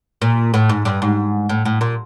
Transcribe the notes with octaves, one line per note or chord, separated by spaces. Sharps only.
A#2
A2
G#2
G2
G#2
A2
A2
A#2